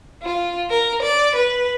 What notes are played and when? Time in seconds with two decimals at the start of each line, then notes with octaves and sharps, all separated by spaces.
0.22 F4
0.70 A#4
1.02 D5
1.35 B4